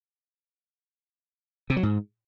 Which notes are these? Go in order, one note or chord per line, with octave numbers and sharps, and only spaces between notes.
C3
F#3
G#2